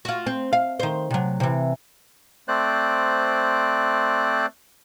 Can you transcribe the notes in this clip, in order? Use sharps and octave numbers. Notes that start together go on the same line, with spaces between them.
F4 F#4
C4
F5
D#3 C5
C3 F#3
C3 E3
A3 C4 C5 D5 F#6